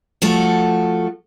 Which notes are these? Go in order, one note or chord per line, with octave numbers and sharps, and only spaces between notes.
F3 A3 F#4 A4